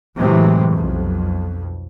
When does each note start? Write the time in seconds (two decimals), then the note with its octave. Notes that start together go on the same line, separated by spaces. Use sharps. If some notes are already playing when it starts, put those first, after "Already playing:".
0.19 A2 C3 E3 F#3 G#3
0.72 B1 F2